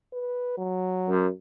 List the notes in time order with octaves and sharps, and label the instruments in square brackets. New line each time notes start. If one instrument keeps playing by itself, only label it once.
[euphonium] B4
F#3
[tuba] F#2